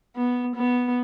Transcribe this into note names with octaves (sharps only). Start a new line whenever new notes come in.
B3
B3